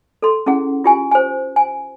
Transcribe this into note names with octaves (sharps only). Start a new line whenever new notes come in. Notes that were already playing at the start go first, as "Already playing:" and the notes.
A4 C6
C#4 E4 G#4 F#5
F4 G4 G#5
C5 G#5
G#5